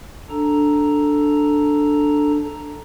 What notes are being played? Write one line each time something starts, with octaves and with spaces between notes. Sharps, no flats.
D4 A4 A#5